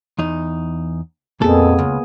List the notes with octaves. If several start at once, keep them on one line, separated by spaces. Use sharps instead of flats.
E2 D#4
F2 A#2 A#3 B3 G#4 A4
C#2